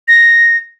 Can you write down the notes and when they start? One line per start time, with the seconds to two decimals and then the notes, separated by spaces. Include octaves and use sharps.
0.08 A#6